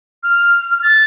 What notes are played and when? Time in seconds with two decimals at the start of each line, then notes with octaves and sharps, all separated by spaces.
0.23 F6
0.82 A6